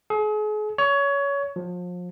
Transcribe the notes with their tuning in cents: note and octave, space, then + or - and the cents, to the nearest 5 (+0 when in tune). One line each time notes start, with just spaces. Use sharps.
G#4 +40
C#5 +20
F3 +35